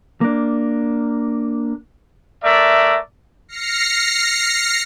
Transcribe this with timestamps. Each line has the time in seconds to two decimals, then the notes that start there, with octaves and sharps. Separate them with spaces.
0.21 A#3 D4
2.43 A3 A#4 D5 E5
3.48 F6 A#6 C7 C#7